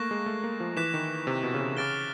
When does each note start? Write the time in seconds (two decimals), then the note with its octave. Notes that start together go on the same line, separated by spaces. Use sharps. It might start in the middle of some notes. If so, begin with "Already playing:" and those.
Already playing: A3 A#3 C#6 F#6 A#6
0.11 G#3
0.26 A3
0.44 A#3
0.60 F3
0.77 E3 D6 F#6 B6 E7
0.94 D#3
1.27 C3
1.43 B2
1.54 C#3
1.60 C3
1.77 C#3 D6 F6 A6 D7 G7